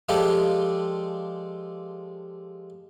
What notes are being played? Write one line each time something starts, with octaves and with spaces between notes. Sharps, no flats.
F3 G#3 F4 G4 A4 D5